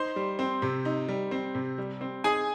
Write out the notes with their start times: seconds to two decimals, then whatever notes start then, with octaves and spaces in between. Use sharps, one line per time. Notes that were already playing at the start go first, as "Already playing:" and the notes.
Already playing: D#4 C5 C6
0.16 G3
0.39 C4
0.62 C3
0.85 D#4
1.08 G3
1.31 C4
1.55 C3
1.78 G3
2.01 C4
2.24 D#4 G#4 G#5